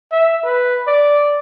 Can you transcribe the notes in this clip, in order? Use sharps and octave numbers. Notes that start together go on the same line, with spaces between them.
E5
B4
D5